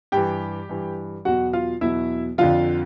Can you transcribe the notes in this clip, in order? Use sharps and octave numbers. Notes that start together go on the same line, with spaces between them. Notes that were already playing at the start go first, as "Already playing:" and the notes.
G2 E3 G4 G5
G2 E3
E2 B2 F#3 F#4 F#5
F4 F5
E2 B2 F#3 E4 E5
F2 D3 F3 F4 F5